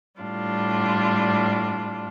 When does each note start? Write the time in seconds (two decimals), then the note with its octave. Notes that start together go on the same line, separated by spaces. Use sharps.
0.22 A2 G3 D4 F4